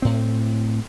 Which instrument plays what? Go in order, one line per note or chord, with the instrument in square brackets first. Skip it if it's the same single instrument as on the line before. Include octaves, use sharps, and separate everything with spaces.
[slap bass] A2 C4